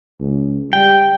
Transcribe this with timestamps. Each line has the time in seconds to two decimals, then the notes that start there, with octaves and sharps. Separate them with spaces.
0.19 C#2
0.73 G3 G5